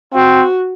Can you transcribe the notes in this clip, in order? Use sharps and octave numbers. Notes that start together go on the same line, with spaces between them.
C4 F#4